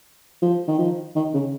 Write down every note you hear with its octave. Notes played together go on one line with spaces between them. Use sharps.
F3
D#3
F3
D#3
C#3